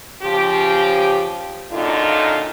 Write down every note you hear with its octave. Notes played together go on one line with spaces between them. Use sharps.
C#3 F3 G4
F#2 A#2 D3 D#4 F4